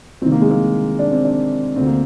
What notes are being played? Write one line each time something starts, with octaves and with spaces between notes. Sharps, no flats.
C2 C3 D#3 C4
A#3
G#3
A#3
D4
C4
D4
D2 D3 C4
A#3